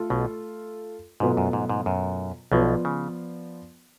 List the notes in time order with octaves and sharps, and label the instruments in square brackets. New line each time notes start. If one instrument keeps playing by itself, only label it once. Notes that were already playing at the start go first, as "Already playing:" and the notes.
Already playing: [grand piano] A3 F4 A4
[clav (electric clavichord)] B1 B2
[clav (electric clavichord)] G#2 [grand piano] B2 F#3 A3 F4 B4
[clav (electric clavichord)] F#2
G#2
G#2
F#2
[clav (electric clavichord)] B1 B2 [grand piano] F3 B3 F4 B4 D5
[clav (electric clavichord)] C#3